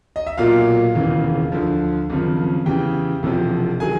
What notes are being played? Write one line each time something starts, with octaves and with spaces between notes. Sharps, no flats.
D#5
E5
B1 A#2 F#3 F4 F5
E1 D#2 C#3 E3
D2 D3 F3
G#1 F#2 C#3 F3
E2 C#3 E3 G4 G5
E1 E2 C3 F3
D#3 F#3 G#4 G#5